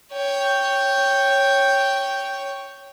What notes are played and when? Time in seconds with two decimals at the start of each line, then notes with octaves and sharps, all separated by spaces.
0.13 C#5 G5